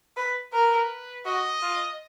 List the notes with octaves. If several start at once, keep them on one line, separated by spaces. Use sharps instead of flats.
B4
A#4 B4
F#4 D#5
F4